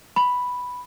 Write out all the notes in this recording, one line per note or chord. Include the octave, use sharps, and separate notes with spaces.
B5